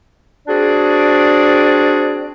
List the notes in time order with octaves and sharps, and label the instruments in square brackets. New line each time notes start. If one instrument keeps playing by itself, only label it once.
[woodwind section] C4 D4 F#4 G#4 D5